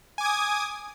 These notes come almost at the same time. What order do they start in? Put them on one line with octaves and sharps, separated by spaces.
G#5 D6 G#6 D#6